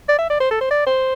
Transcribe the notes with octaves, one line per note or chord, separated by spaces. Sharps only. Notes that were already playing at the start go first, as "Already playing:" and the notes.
D5
E5
D5
C5
A4
C5
D5
C5